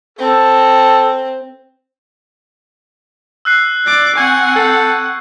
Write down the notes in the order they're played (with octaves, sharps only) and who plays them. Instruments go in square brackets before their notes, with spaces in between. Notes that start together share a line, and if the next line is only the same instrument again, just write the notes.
[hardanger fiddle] C4 [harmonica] A4
[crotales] E6 F#6 C7
[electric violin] D5 D6
[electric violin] C4 F#5 [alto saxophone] G#5 [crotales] C#6 G6 G#6
[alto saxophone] A4